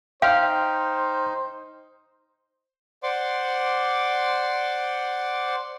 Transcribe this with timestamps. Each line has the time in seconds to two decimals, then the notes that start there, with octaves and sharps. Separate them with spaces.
0.22 D#4 C5 F5 G5 C6 F6
3.03 C5 D5 F#5 C6 D6